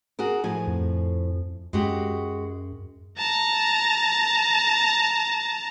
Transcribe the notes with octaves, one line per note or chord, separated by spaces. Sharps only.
F#4 G#4 A#4
A2 F3 G#5
F2
F#2 G#3 F#4 G4
A5 A#5